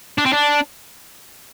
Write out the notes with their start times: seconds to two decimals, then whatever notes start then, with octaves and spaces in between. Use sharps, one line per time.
0.18 D4
0.26 C4
0.33 D4